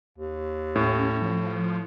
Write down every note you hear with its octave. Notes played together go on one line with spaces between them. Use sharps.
D#2
A2 C#4
F3